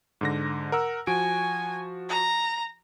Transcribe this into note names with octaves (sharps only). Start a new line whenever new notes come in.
G#2 D3 A#6
A#4 F#5 E6
F3 F#4 G#5 D7
A#5